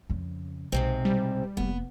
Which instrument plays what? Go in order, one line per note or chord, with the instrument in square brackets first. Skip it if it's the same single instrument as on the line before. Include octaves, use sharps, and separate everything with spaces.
[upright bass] F2 C#3
[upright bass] B1 [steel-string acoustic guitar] G#2 C3 C4
[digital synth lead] G3
[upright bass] F1 A#3 [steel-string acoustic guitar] B3